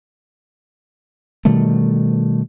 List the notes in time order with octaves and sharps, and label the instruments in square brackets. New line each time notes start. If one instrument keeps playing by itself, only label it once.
[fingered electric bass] B2 D#3 G3 A3